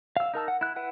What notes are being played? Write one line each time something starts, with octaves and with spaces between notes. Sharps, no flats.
F5 E6
D#4 A#4 A5 E6
F#5
E4 F#6
E4 B4 F#5